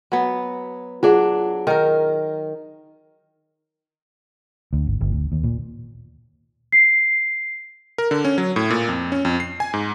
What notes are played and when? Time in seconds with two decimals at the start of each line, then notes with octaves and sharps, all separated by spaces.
0.12 F#3 B3
1.03 F#3 D4 F4 G#4 F#5
1.67 D#3 A#4
4.73 D2
4.87 G#1
5.01 G1
5.12 D2
5.32 D#2
5.44 A#2
6.72 C7
7.98 A#4
8.11 D3
8.25 C#4
8.38 F#3
8.56 A2
8.70 A#2
8.89 F2
9.12 C#4
9.25 F2
9.40 C7
9.60 G#5
9.74 G#2